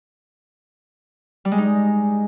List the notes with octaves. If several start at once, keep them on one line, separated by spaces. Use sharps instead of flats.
G3
G#3
D#4